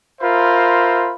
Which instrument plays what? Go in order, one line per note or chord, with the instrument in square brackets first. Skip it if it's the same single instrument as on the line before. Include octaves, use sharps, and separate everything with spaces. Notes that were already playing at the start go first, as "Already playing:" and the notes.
[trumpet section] F4 A#4 C5 E5 B5